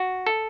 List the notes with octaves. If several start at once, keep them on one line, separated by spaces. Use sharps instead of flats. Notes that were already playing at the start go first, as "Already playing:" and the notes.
Already playing: F#4
A4